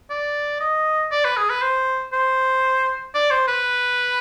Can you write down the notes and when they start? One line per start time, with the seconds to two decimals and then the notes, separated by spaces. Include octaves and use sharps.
0.10 D5
0.60 D#5
1.12 D5
1.25 B4
1.37 G#4
1.49 B4
1.62 C5
2.13 C5
3.15 D5
3.31 C5
3.48 B4